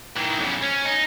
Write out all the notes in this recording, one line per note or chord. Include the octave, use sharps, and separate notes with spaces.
D#3 E3
B1 C#3
C#4
D#4